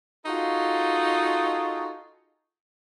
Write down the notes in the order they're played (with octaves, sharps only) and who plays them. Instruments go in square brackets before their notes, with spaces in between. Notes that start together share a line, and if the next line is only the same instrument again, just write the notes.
[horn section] D#4 F4 F#4 G#4 A4